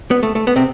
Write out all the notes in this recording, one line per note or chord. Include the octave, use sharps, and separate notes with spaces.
B3
A3
A3
B3
C3 C4